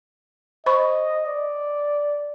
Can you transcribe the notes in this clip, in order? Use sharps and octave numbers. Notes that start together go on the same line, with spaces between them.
C5 D#5 B5 C#6
D5